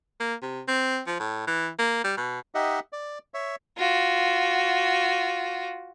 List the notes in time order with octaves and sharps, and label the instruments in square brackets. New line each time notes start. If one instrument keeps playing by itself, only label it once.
[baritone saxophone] A#3
C3
C4
F3
A2
E3
A#3
G3
B2
[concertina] D#4 G4 D#5 E5 F#5
D5
C#5 E5
[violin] F4 F#4